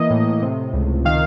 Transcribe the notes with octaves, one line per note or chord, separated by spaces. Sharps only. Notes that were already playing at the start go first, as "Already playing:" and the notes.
Already playing: E3 A#3 D#5
A2
C3
C#2
D#3 F5